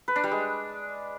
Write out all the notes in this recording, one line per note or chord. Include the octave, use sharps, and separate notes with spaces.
B4
D4
G3
G#3